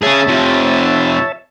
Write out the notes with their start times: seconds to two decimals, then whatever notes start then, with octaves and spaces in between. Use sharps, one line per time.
0.03 C#4 G#4 C#5 E5 A5
0.28 C3 F3